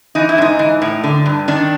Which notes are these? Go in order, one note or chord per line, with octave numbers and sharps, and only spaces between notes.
E3 D#4
E4
G#2 D#4
E3
A2
D3
G2
D#3 D4